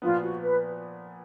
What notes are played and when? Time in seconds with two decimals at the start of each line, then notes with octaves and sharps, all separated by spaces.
0.02 A#2 F3 B3 F4
0.21 F#4
0.41 B4